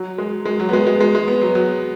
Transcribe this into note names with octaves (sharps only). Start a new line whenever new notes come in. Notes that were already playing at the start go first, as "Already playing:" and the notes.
Already playing: F#3
G#3
G#3
F#3
B3
G#3
G#3
G#3
G#3
B3
F#3
F#3